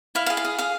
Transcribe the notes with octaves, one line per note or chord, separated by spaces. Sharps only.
E4 F5
F5
G#4
F5
G#4
G#4 F5